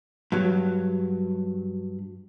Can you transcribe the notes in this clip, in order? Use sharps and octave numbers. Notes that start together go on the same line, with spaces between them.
G2 F#3